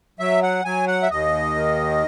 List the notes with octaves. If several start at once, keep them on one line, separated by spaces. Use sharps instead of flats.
F#3 E5
F#5
F#3 G#5
F#5
E5
D#2 D#5
D#3